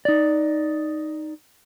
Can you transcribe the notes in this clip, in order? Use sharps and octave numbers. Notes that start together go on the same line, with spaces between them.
D#4 D5